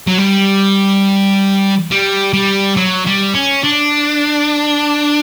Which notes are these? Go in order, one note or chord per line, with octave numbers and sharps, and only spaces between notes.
F#3
G3
G3
G3
F#3
G3
C#4
D4